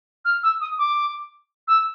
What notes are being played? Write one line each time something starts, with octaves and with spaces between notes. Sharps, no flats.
F6
E6
D#6
D6
E6